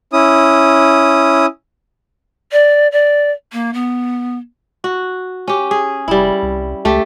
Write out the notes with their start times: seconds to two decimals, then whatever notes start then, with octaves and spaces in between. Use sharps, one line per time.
0.13 C#4 E4 D#6
2.52 D5
2.92 D5
3.52 A#3
3.73 B3
4.84 F#4
5.48 C#4 G4
5.71 G#4
6.08 F1 G3 E4
6.43 C2
6.85 C#2 A3 G4